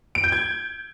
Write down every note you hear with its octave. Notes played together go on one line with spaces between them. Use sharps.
D7
G6
G#6